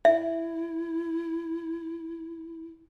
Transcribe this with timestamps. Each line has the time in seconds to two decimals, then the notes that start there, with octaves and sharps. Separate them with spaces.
0.05 E4 E5